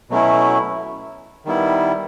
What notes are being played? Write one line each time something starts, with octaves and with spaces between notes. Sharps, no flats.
B2 F#3 A3 C#4 E4
D#3 G3 B3 E4